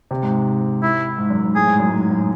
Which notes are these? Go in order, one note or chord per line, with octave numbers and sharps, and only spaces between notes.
C3
G#2
E4
G#2
F#2
G#2
A2 G#4
G#2
F#2
G#2
A2